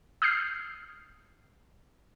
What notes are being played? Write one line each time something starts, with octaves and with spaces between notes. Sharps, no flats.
D#6 F6 G6 C7